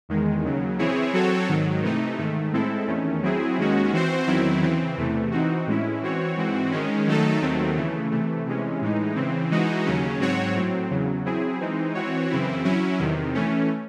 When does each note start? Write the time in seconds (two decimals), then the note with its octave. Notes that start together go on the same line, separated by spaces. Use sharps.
0.09 E2 D#3 G#3
0.43 D#2 C#3 F#3
0.79 E3 C4 E4 G#4 C#5
1.13 F#3 C4 F#4 A4 C#5
1.48 G#2 D#3 F#3
1.83 C3 E3 A3 D#4
2.18 G#2 D#3 A3
2.53 A2 G#3 C4 E4 A4
2.88 E2 D#3 A3 C#4
3.23 F#3 C4 E4 G#4
3.57 D#2 D#3 G#3 C#4 F#4
3.93 E3 C4 F#4 C5
4.27 E2 D#3 F#3 C4 E4
4.62 C#3 E3 C4
4.97 E2 C3 E3 A3
5.31 E3 C4 D#4 F#4
5.66 A2 E3 G#3 C#4 E4
6.01 E3 C4 F#4 C#5
6.36 G#2 E3 C4 F#4
6.71 D#3 G#3 C#4
7.07 D#3 F#3 A3 D#4 A4
7.41 D#2 D#3 F#3 A3 C4
7.76 C#3 E3 A3
8.11 C3 E3 A3
8.46 C3 E3 G#3 C#4
8.81 A2 E3 G#3 D#4
9.15 C#3 E3 C4
9.50 E3 G#3 D#4 F#4
9.85 D#2 C#3 F#3 C#4
10.20 G#2 F#3 C4 F#4 C#5
10.55 A2 F#3 C4
10.91 E2 C#3 F#3
11.24 F#3 C4 E4 G#4
11.60 E3 G#3 C4 D#4
11.94 E3 C4 F#4 C#5
12.30 F#2 C#3 E3 C4 E4
12.64 F#3 C#4 E4
12.99 E2 C3 D#3
13.34 E3 A3 C#4